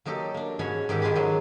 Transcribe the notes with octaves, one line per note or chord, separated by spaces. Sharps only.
F#3 A#3 D#4 G4 A4
A#3 D4
G#2 C#4 F#4 C#5 G#5 B5
G#2 D#3 G4 A4
D#3 F4 G#5 A5 B5
G#2 F#3 G#3